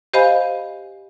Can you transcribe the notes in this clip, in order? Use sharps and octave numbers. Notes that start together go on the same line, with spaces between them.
G4 C5 D#5 F5 G#5 B5